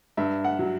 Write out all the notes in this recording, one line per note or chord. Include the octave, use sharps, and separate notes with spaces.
G2 E5
F#5
F#3